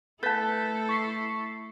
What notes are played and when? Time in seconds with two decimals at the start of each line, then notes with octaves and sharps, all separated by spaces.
0.23 A3 E4 A4 B4 A5 G6 A6 B6
0.89 C#6 B6 C7